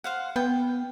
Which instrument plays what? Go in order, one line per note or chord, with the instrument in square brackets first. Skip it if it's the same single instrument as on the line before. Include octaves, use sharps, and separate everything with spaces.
[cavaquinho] C5 F5 F#5
[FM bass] B3 [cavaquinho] G5